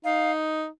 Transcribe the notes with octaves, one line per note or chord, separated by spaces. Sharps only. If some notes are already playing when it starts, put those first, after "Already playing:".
D#4 F5